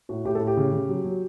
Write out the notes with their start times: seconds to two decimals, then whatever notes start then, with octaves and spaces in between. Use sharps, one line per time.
0.09 A2 F#4
0.25 A2 G4
0.35 A4
0.41 A2
0.47 G4
0.57 C#3
0.73 C#3
0.89 F#3
1.04 F#3